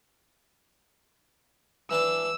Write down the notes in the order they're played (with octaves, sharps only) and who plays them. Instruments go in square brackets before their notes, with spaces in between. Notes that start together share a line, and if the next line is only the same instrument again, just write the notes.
[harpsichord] E3 D4 A5 [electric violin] E6